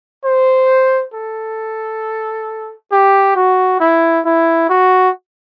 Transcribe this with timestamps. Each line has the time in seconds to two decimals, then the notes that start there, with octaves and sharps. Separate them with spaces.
0.25 C5
1.14 A4
2.92 G4
3.36 F#4
3.80 E4
4.25 E4
4.70 F#4